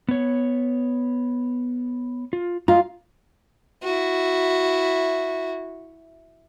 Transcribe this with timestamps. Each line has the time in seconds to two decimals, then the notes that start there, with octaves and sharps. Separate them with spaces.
0.09 B3 C#5
2.33 F4
2.68 F4 D#5 A#5
3.83 E4 F#4